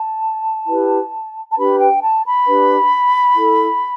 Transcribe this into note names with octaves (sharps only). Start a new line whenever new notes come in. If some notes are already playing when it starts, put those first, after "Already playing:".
Already playing: A5
E4 G4 B4
A5
D4 G4 B4 B5
G5
A5
B5
D4 G4 B4
E4 A4